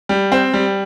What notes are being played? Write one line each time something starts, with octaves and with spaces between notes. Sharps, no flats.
G3
C4
G3